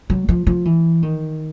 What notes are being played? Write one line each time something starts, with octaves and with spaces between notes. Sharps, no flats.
F#3
F3
F3
E3
D#3